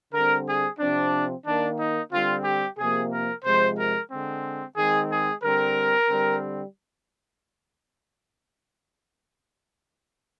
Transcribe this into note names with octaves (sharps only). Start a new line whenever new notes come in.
D3 G3 C4 A#4
G#4
C3 F3 C4 D4
D#3 A#3 D4
D#4
D3 G3 C4 F4
G4
C3 F3 A#3 G#4
A#4
C3 F3 G#3 C5
A#4
D3 G#3 C4
D#3 G#3 C4 G#4
G#4
D3 G3 C4 A#4
D3 G3 C4